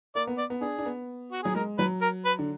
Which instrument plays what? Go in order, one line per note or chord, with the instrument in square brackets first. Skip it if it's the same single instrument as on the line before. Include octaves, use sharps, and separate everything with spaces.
[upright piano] A#3 [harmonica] D5
[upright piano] B3
[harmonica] D5
[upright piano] B3
[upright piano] D4 [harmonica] G#4
[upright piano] D4
B3
[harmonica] F#4
[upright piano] F#3 [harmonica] G#4
[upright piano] G#3 [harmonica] A#4
[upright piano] F#3 [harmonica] B4
[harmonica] A#4
B4
[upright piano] D3